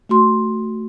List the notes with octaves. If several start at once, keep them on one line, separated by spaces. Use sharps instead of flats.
A3 F#4 C6